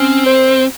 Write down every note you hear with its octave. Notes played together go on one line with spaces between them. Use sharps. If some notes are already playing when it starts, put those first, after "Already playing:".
Already playing: C4 C#4
C5